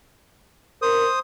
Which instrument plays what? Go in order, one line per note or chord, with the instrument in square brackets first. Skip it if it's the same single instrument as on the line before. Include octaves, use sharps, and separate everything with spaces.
[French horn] A#4 [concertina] C5 D#6